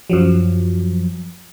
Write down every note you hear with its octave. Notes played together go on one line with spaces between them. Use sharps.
F#2 F3 F#3